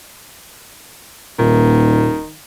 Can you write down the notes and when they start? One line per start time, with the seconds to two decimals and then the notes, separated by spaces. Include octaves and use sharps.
1.39 D#1 A#2 D#3